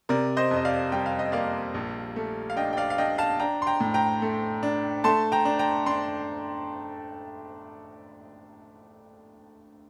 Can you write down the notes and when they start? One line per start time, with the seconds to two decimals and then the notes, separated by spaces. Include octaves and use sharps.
0.09 C3 A#4 D5
0.37 C5 D#5
0.51 F2
0.56 D#5
0.65 D5 F5
0.92 G3 G5
1.06 F5
1.19 D#5
1.32 A#3 D5 F5
1.74 A#1
2.16 A3
2.50 F5
2.56 D4 D#5 G5
2.73 G5
2.77 D5 F5
2.90 F5
2.98 D4 D#5 G5
3.18 F5 A5
3.39 D4 G5 A#5
3.62 C6
3.67 G5 A#5
3.80 A2
3.94 G5 A#5
4.22 A3
4.63 D4
5.04 A3 A5 C6
5.32 G5 A#5
5.45 D4
5.59 G5 A#5
5.86 D4 C6